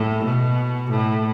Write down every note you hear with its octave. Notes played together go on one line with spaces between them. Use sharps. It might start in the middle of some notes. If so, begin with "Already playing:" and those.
Already playing: A2
B2
A2